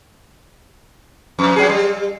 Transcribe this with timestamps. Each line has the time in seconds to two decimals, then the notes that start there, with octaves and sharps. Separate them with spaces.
1.39 F2
1.56 G2 F#3 G#4
1.69 G3